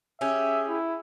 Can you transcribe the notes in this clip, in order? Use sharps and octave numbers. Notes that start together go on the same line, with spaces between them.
C#4 G4 G#4 E5
E4